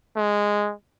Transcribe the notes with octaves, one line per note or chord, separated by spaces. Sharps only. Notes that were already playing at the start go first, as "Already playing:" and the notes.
G#3